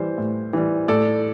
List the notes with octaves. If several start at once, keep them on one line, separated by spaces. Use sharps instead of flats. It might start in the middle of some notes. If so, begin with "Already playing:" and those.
Already playing: E3 G3 C5
A2
E3 G3
A2 A4 D5